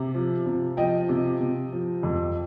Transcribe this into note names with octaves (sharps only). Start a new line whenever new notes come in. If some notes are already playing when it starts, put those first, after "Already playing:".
Already playing: C3
F3
C3
F3 D#5 G5
C3
C3
F3
F2